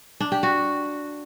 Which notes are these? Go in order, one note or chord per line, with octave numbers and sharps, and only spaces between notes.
D4
G4
F#4